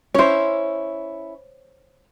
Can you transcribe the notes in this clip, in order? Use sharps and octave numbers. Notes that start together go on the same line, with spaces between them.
C#4 E4 C5 C#5